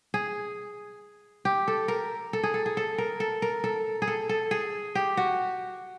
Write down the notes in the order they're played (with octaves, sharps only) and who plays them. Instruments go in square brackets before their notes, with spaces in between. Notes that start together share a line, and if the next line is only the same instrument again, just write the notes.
[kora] G#4
G4
A4
A#4
A4
G#4
A4
G#4
A4
A#4
A4
A#4
A4
G#4
A4
A4
G#4
G4
F#4